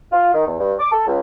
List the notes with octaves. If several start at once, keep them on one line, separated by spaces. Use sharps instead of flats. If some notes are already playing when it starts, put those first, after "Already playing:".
F4
D#3
E2
G2
D6
A4
C#2